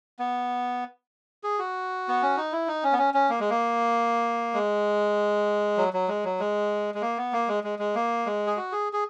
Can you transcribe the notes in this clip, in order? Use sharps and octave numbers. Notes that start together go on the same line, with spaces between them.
B3
G#4
F#4
B3
C#4
D#4
E4
D#4
C#4
B3
C#4
C#4
A#3
G#3
A#3
G#3
F#3
F#3
G#3
F#3
G#3
G#3
A#3
B3
A#3
G#3
G#3
G#3
A#3
G#3
G#4
F#4
G#4
G#4